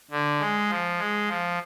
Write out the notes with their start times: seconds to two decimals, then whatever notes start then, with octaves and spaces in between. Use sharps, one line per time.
0.11 D3
0.40 G#3
0.69 F3
0.98 G#3
1.28 F3